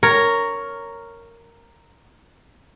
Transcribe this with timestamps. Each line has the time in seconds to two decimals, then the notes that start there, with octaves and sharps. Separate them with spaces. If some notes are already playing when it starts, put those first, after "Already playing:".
0.03 A#4 C#5